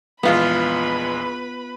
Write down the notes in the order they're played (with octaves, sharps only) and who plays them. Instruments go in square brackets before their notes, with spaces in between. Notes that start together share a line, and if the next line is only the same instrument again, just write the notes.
[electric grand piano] A#1 E2 G#3 [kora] B3 F4 [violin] B4 B5